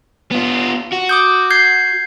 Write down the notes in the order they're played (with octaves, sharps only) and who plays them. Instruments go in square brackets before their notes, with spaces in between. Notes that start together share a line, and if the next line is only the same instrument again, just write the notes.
[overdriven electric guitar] B3 F4
F#4
[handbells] D6 D#6 G6
G6 G#6 C7